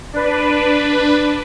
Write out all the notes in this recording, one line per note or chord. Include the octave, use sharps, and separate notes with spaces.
D4 B4